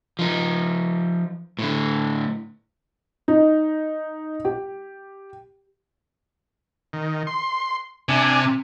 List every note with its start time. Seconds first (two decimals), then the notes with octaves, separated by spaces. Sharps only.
0.19 F3 D#4
1.59 A2 D3
3.28 D#4
4.45 G4
6.93 D#3
7.27 C6
8.09 C3 D4 G#5